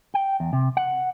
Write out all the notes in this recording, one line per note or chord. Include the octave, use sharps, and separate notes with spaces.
G5
E2
C3
F#5